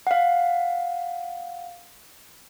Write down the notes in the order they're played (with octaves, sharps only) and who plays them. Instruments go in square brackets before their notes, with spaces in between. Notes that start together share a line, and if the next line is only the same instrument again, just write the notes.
[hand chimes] F5 F#5